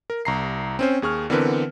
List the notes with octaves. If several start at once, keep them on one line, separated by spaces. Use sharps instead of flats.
A#4
C2 A#5 C7
C4 C#4 C5
D#2 G#4 C#6 F6
D3 E3 B3 C4 A#4 B4